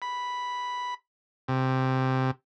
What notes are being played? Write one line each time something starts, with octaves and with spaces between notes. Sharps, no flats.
B5
C3